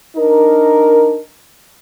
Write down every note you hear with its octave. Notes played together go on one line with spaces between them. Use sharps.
D4 D#4 A#4